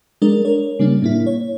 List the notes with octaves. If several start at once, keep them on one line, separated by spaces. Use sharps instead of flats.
G#3 D4 A#4 D5
A#4 C#5
C#3 G3 A#3 D4
A2 A#3 E4
C#5